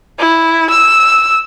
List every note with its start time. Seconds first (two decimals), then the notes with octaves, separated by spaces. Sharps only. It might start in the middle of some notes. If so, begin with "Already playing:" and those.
0.19 E4
0.70 E6